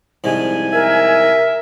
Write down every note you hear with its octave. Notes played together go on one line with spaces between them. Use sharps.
C2 G#2 F3 G#5
A#4 E5